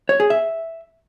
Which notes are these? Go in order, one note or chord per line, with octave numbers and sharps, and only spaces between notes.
C#5
G#4
E5